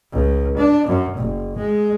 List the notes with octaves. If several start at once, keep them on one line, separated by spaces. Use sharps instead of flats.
C#2
D4
F#2
F#1
G#3